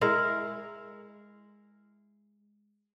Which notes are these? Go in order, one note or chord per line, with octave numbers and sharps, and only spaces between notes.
G#3 E4 A#4